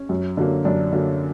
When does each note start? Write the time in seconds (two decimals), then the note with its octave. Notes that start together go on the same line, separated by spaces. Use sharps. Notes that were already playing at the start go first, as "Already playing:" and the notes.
Already playing: C#4
0.09 F#2
0.37 D3 F#3 A#3
0.65 F#2 D4
0.93 D3 F#3 A#3